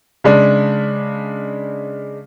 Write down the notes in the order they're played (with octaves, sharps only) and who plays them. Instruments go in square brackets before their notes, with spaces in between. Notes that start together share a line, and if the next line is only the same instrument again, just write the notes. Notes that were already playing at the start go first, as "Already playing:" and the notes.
[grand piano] C#3 G#3 D4